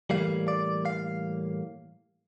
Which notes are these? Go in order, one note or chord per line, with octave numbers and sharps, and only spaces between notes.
A2 E3 G3 A#3 F5
D5
F5